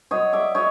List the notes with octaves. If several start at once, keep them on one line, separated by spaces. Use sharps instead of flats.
F#3 C#5 D#5
D5 E5
F#3 C#5 D#5